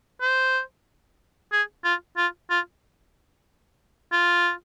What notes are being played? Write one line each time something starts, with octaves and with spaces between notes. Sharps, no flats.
C5
G#4
F4
F4
F4
F4